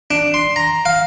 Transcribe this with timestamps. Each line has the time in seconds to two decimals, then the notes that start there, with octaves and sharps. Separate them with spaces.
0.11 D4
0.34 C6
0.56 A#5
0.85 F5